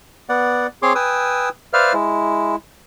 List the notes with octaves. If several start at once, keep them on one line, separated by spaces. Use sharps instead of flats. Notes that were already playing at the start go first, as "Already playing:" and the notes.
B3 D5 F#5
C4 G#4 C#5 C6 D6
B4 G5 G#5 D#6 E6
B4 C5 D5 E5 F5 F6
G#3 E4